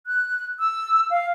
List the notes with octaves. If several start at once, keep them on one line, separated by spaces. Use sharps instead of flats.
F#6
E6
F5